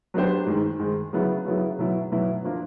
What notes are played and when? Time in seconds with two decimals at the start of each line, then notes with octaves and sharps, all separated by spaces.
0.14 F#3 B3 D4 G4 C5
0.46 G#2 D#3 G#3
0.79 G#2 D#3 G#3
1.13 C#3 F#3 B3 E4
1.45 C#3 F#3 B3 E4
1.79 B2 F#3 B3 E4
2.12 B2 F#3 B3 E4
2.44 F3 A#3 D4